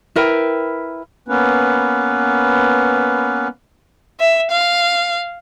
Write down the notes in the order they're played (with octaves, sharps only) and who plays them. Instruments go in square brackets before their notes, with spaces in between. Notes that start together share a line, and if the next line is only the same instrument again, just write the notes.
[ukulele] E4 A#4 B4 G5
[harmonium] A#3 B3 C#4 B4
[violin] E5
F5